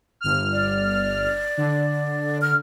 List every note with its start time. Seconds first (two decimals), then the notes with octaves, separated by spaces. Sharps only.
0.21 G1 F6
0.53 D5
1.57 D3
2.42 F6